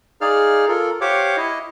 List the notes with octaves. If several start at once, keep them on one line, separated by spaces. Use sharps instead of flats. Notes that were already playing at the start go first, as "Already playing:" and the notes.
D#4 G#4 D5 F5 F6
F4 A4 A#4
G4 C5 C#5 F5 F#5 D6
E4 D#5